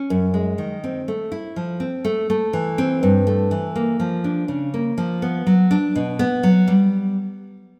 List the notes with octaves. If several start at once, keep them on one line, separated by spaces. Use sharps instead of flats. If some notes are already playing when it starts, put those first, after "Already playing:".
Already playing: C#4
F#2
G#3
D#3
C4
A3
E4
F3
C4
A3
A3
E3
C4
G2
A3
E3
A#3
F3
D4
C#3
A#3
F3
B3
F#3
D4
B2
B3
F#3
G3